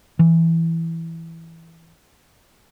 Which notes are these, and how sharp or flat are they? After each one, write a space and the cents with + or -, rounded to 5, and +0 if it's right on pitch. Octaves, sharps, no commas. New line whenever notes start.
E3 +0